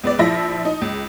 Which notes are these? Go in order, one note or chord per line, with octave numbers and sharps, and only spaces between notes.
C#2 B3 D5
A#1 F3 E4 E5 A#6
D#4
C#2